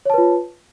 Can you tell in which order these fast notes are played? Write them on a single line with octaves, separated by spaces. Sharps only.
C#5 A5 B4 F4